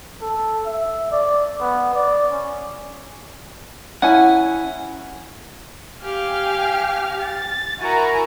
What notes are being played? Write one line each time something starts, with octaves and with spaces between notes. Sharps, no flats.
A4
E5
D5
B3
D5
C#4
C#4 E4 F#5 G#5
G4 F5 G#5 F6
A6
E4 F#4 A#4 G#5 A#5